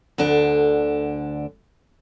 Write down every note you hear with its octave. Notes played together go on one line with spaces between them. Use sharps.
D2 D3 D4